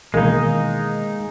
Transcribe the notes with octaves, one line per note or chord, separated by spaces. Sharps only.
B2 D#3 E3 G#3 A#3 D#4